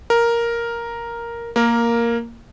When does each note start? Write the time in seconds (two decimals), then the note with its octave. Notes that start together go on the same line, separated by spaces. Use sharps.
0.10 A#4
1.56 A#3 A#4